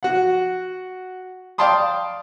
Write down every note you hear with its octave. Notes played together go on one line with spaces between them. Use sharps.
F#4 F#5
D5 F5 G5 A5 C6 D#6